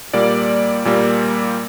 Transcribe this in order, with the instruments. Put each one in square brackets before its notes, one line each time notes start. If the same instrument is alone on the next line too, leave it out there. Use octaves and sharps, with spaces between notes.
[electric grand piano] A#2 G3 A#3 D5
A#2 G3 A#3